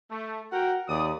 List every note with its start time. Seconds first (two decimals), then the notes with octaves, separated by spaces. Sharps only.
0.10 A3
0.52 F#4 A#4 F#5 G5
0.89 D#2 D5 D#6